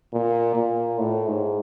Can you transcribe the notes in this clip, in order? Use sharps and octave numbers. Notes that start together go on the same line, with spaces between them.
A#2
A#2
A2
G#2